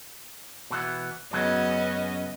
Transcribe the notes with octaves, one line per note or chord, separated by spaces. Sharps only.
B2 E3 B3
F#2 C#3 F#3 B3 C#4 D#5